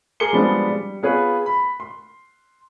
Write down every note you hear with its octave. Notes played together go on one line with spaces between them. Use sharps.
G#4 A#4 C6 D6 C#7 G7
F3 G3 G#3 B3 D4
G3
B3 F4 G#4 B4 C#5
B5
C6